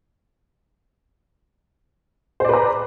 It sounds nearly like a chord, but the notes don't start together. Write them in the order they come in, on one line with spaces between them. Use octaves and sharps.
C5 D5 B4 A#5